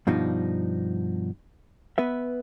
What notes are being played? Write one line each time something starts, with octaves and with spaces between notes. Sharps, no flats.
G2 B2 F3 D4 D#4
B3 B4 E5